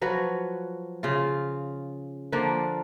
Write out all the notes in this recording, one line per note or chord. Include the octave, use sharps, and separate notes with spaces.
F3 F#3 F#4 B4
C#3 F4
D3 F3 A#3 D4